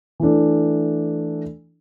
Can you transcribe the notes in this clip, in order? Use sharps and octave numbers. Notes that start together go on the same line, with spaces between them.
E3 A3 D4